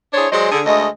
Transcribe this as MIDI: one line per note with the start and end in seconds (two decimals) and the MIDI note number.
0.14 0.26 62
0.14 0.26 64
0.14 0.26 68
0.14 0.26 72
0.14 0.26 73
0.31 0.51 54
0.31 0.51 56
0.31 0.51 68
0.31 0.51 72
0.31 0.51 74
0.31 0.51 75
0.51 0.60 50
0.51 0.60 68
0.66 0.86 38
0.66 0.86 56
0.66 0.86 57
0.66 0.86 75